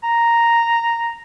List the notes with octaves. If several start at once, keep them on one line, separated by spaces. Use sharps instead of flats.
A#5